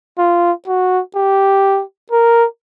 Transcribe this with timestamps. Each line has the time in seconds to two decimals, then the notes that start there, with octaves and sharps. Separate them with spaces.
0.18 F4
0.67 F#4
1.15 G4
2.12 A#4